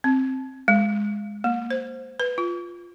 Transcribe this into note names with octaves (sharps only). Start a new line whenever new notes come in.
C4
G#3
A#3
C5
B4
F4